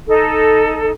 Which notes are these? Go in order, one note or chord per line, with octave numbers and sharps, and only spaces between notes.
D#4 A4